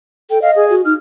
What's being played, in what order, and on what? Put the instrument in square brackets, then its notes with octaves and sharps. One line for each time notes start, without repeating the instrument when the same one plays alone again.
[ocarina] A4 [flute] G5
[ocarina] D#5 [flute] F5
[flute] G#4
[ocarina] F#4
[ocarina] D#4 [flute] F6